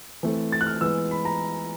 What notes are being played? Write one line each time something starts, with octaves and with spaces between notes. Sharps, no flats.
E3 A3 C4
A6
F#6
F6
E3 G#3 B3 E6
B5
A#5